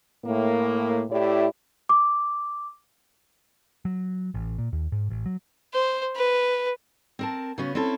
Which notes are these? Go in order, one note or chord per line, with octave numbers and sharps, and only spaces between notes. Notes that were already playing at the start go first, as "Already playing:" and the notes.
A2 A#3
A2 E4 G4 D5
D6
F#3
A1
A#2
D#2
G#2
A1
F#3
C5
B4
C4 A#4 A5
C#3 B3 C#4 F#4
C4 C#4 E4 A4